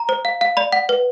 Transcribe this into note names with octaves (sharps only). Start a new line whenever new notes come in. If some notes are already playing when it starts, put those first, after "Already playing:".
Already playing: A#5
C5
F5
F5
D5 B5
F#5
B4